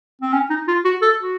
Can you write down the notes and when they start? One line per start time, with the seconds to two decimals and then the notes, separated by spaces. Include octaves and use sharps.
0.22 C4
0.33 C#4
0.50 D#4
0.68 F4
0.85 F#4
1.02 A4
1.20 F#4